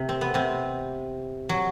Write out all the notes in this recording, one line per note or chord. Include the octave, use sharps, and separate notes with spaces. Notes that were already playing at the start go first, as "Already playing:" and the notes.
Already playing: C3
C4
B3
C3 C4
F#3